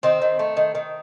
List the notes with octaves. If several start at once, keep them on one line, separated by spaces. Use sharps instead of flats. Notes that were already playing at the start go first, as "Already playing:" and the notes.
D#3 C4
D#3
A3
D#3
D#3